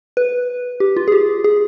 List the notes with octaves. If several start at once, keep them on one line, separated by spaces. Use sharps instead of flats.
B4
G4
F4
G#4
G4
G#4